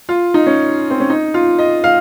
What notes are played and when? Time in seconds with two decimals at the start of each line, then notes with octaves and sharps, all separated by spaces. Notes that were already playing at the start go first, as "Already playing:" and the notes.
0.09 F4
0.34 D#4
0.47 C#4
0.91 C4
1.00 C#4
1.10 D#4
1.34 F4
1.59 D#5
1.84 F5